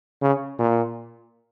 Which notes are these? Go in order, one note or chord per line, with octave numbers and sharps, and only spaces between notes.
C#3
A#2